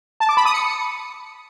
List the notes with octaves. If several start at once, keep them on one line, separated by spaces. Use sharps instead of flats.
A5
D6
B5
D#6
C#7